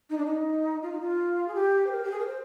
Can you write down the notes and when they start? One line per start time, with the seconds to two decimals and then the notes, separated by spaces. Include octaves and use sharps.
0.10 D#4
0.17 D4
0.25 D#4
0.82 F4
0.91 D#4
1.00 F4
1.47 G#4
1.54 G4
1.86 C5
1.90 A#4
2.04 G4
2.11 G#4
2.19 A#4
2.26 C5